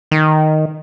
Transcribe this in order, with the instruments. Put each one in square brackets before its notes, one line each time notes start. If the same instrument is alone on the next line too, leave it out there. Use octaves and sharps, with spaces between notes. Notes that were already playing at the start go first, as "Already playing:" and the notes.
[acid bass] D#3